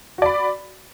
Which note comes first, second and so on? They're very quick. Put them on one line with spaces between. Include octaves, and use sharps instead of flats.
F#4 D5 B5